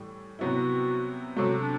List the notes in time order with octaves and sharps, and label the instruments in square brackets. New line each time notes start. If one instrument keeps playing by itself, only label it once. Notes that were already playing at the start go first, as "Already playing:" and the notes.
Already playing: [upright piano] A2 E3 G3
[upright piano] C3 F#3 B3 E4 [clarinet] F#4
[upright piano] C3 F#3 A3 [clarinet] F#4
[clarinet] D4